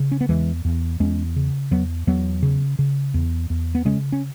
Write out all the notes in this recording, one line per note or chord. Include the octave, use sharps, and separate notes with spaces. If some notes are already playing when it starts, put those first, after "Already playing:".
Already playing: C#3
C#4
B3
E2 E3 G#3
E2
E2 G#3 C#4
C#3
E2 F#3 B3
E2 F#3 B3
C#3
C#3
E2
E2
B3
C#3 G#3 C#4
C#4